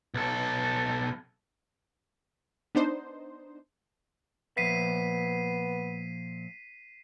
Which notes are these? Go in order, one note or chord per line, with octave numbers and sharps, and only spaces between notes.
B1 A4
B3 D4 D#4 C5
A#2 F3 B3 E5 B6 C7 D#7